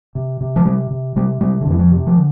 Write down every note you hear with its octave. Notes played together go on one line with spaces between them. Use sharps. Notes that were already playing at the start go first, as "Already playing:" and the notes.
C3
C3
F3
C3 G3
C3
C3 G3
C3 G3
D3
F2 E3
F3
C3
F3
D3